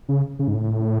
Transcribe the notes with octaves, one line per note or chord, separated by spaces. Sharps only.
C#3
C#3
G#2
A2